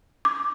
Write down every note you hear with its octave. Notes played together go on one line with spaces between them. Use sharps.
D6